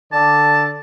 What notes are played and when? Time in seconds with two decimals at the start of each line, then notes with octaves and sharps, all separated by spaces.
0.12 D3 A4 D5 A5